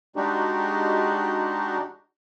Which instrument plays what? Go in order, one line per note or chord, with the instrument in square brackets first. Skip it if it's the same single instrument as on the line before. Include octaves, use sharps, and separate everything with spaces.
[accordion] G3 G#3 D4 D#4 F#4 G4